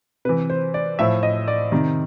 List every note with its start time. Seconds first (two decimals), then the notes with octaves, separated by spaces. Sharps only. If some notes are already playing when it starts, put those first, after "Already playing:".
0.25 C3 B4
0.29 E3
0.50 C5
0.74 D5
0.99 A2 F3 E5
1.23 D#5
1.48 D5
1.72 C3 D#3